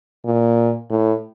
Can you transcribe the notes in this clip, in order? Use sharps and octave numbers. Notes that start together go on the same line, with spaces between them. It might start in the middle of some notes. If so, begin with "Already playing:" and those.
A#2
A2